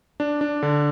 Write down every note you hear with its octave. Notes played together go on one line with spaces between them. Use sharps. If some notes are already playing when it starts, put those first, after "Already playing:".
D4
D4
D3